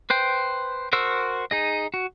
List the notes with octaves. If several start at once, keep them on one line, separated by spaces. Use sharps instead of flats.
B4 C5 G5
F#4 A#4 C5 E6
D#4 G#4 D#5
F#4